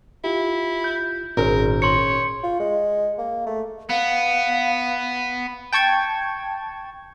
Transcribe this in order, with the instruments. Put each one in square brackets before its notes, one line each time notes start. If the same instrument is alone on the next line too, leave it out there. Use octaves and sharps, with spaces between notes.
[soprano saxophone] E4 [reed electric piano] F4 G4
[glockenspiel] G6
[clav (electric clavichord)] G#1 [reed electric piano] A#2 C#4 G#4 [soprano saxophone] A#4
[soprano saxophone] C#5 [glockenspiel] C6 C#7
[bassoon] F4
G#3
A#3
A3
[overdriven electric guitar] B3 [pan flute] F5
[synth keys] G5 A5 C#6 G#6